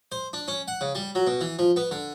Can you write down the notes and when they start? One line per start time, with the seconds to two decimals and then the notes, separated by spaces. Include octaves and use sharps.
0.12 C5
0.33 D4
0.48 C#4
0.68 F#5
0.81 C#3
0.95 G3
1.15 F#3
1.27 B2
1.41 E3
1.59 F3
1.76 B3
1.91 D3